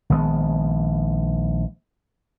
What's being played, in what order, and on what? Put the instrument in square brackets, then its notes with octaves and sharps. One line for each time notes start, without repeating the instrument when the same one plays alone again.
[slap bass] A#1 D#3 G#3 B3